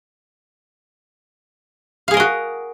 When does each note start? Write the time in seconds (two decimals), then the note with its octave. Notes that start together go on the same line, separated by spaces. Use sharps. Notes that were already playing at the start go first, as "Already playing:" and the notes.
2.08 F5
2.11 G#4
2.14 A#4
2.17 D#5
2.20 F#4